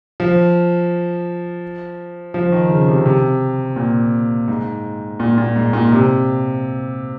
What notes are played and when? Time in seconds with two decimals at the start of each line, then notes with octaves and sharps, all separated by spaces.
0.20 F3
2.34 F3
2.52 D#3
2.70 C#3
2.88 C3
3.05 C3
3.76 A#2
4.48 G#2
5.20 A#2
5.38 A#2
5.56 G#2
5.73 A#2
5.92 C3